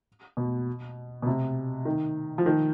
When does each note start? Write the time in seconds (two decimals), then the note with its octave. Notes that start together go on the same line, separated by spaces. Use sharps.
0.37 B2
1.22 B2
1.27 C3
1.85 D#3
2.38 F3
2.46 D#3